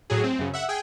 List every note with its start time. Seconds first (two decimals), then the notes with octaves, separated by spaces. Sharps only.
0.10 A2 F#3 G#4
0.24 C4
0.39 F#2 C#3
0.54 E5 F#5
0.68 G#4 G5 G#5